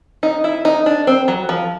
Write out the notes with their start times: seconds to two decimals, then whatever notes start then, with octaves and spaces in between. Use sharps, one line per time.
0.23 D#4
0.44 E4
0.65 D#4
0.86 D4
1.07 C4
1.28 F#3
1.49 F3